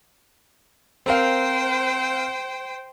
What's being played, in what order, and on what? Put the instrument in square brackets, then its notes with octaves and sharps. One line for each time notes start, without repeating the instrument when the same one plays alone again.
[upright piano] C4 A#4 F5 [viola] C5 G5